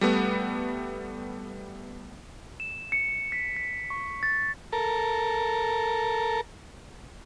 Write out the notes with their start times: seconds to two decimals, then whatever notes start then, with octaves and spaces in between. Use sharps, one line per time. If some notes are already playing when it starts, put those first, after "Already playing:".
0.01 G3 A3 B3
2.60 E7
2.92 C#7
3.32 B6
3.56 B6
3.90 C#6
4.23 A6
4.72 A4 A#4